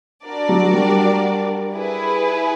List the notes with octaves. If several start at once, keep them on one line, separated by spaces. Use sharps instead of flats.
D4 F#4 A#4 D5
F#3
G3
E4 G#4 B4